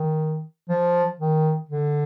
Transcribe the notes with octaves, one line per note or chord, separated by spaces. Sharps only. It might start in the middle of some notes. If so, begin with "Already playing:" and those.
Already playing: D#3
F3
D#3
D3